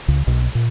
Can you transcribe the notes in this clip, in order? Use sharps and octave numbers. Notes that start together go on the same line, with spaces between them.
C#2 C#3
B1 B2
A#2